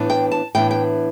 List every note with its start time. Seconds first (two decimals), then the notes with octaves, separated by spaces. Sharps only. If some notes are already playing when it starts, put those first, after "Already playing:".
Already playing: A2 E3 B3 D4
0.10 G5
0.31 A5
0.55 A2 E3 B3 D4 G5
0.71 G5